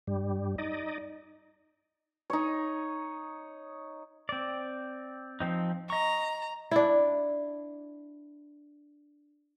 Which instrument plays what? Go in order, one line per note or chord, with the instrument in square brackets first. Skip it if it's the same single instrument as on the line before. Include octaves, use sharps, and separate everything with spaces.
[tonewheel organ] G2 G3
D#4 D5 D#5
[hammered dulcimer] D#4 C#5
[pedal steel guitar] C4 D5
F3 C4 D#4
[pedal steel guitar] D#5 C#6 [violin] A#5
[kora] D4 E4